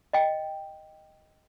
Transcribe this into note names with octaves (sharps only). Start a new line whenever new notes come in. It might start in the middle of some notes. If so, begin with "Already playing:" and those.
D#5 G5